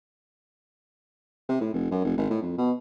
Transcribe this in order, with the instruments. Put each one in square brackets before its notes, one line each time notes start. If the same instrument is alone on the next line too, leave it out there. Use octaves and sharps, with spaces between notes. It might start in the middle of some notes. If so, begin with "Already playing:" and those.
[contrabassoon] C3
A2
F1
F#2
F1
G#1
A2
F2
B2